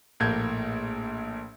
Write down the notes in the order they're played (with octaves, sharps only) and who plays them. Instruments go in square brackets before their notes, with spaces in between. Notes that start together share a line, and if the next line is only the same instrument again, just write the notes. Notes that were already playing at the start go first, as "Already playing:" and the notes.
[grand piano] A#1 A2 A#3 G6 G#6